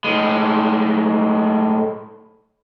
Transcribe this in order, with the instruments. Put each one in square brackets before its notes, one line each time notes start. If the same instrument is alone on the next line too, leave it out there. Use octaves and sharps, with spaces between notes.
[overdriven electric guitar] A2 G#3